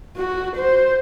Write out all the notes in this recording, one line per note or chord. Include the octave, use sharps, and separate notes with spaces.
F#4
C5